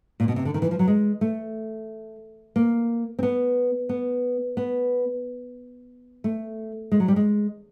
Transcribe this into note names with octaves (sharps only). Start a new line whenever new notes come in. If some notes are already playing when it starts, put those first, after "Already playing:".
A#2
B2
C3
D3
D#3
E3
F3
F#3
G#3
A3
A#3
C4
B3
B3
B3
A3
G#3
F#3
G3
G#3